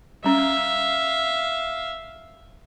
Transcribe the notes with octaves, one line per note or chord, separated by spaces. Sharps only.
G3 C#4 E5 F5